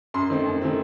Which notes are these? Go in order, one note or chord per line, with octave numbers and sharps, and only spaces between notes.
F#2 C6
D#3 A3 C4
F#2
D#3 A3 C4